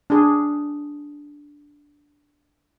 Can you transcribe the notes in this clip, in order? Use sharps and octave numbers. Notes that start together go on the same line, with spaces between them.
D4 G#4